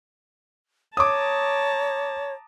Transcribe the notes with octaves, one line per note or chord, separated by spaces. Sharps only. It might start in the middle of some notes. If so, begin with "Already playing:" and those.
C#5 A5 A#5 D6 D#6